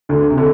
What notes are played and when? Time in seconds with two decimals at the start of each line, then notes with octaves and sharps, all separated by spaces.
0.09 D2 D3
0.30 C3
0.38 D3